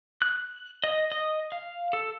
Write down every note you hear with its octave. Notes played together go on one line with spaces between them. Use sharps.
F#6
D#5
D#5
F5
A4